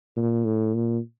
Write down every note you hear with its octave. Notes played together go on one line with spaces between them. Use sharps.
A#2
A2
A#2